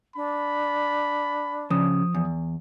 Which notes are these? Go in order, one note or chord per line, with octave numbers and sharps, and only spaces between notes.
D4 B5
C#3 F3 D#6
E2